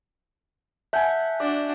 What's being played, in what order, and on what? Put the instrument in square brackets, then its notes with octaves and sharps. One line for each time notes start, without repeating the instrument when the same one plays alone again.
[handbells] E5 A5 G6 [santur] F#5 G#5
[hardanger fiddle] D4 F#4 [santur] D5